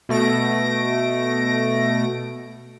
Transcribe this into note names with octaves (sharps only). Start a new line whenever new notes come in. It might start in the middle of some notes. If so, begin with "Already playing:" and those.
B2 A3 A#6 D7